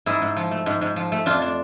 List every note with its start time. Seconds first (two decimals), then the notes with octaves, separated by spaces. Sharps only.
0.06 G#2 E4 G#4
0.22 G#2
0.36 F3
0.51 A3
0.66 G#2
0.81 G#2
0.96 F3
1.12 A3
1.26 F2 D4 F4
1.42 D4